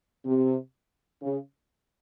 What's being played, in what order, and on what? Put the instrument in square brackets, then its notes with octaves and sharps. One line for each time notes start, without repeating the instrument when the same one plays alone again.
[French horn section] C3
C#3